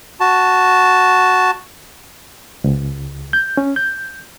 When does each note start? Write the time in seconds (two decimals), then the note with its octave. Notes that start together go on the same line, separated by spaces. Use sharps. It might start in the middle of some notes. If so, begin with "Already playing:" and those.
0.20 F#4 A5
2.64 C#2
3.33 G6
3.57 C#4
3.76 G6